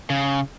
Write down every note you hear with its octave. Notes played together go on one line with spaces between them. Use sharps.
C#3